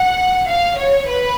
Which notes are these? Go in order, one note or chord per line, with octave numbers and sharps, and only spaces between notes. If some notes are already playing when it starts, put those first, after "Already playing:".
Already playing: F#5
F5
C#5
B4